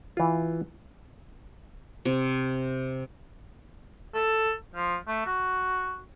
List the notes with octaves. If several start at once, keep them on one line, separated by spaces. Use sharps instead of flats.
E3 F4
C3
A4
F3
A3
F#4